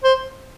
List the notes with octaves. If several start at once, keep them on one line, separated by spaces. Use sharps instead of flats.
C5